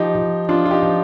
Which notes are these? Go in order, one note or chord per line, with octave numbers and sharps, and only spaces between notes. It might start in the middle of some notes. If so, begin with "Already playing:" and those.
Already playing: F3 D#4 G4
F3
F3 D4 F4
F4
D#4 G4
F3